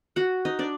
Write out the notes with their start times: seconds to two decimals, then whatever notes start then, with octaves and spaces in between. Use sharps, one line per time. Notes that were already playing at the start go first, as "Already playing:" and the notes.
0.16 F#4 F#5
0.45 D#4 D#5
0.59 D4 D5